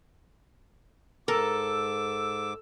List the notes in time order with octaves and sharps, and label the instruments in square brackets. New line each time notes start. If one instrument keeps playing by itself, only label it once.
[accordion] G#2 D6 [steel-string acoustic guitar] A4 [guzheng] A#4 [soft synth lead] E6